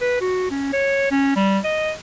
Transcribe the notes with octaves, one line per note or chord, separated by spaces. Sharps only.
B4
F#4
C#4
C#5
C#4
G3
D#5